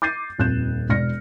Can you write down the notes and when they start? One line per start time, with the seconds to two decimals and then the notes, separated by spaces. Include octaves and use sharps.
0.02 D6 G6 A6 C7 D#7
0.38 D#1 F2 F#6 G6 E7
0.89 E1 D5 F6 A#6 C#7